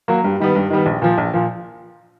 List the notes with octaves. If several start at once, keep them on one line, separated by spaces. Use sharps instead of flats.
F#3 A#3
G2
D#3 G3 B3
G2
D#3 G3 B3
A#1
A#2 F3
A#1
A#2 F3